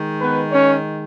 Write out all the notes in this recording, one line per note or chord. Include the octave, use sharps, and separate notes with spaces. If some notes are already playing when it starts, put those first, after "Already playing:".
Already playing: D#3 G#3
B3 B4
C#4 C#5